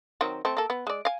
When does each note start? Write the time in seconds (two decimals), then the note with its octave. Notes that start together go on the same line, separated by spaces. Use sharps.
0.21 D#3 F#3 C4
0.45 A3 C4
0.57 A#3 A4
0.70 B3
0.87 G#3 D5
1.05 F5 G#5